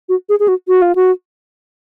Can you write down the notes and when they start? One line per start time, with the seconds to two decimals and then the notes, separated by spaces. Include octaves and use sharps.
0.09 F#4
0.29 G#4
0.40 G#4
0.48 F#4
0.68 F#4
0.82 F4
0.95 F#4